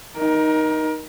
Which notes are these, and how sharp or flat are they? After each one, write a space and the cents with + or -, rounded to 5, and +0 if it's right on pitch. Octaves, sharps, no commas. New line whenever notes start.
D#4 +0 A#4 +25